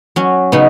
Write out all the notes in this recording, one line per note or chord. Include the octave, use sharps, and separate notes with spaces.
F#3 C#4
C#3 B3 D#4